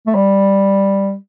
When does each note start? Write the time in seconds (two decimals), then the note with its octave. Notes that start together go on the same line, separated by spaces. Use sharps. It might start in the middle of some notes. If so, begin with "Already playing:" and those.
0.07 A3
0.15 G3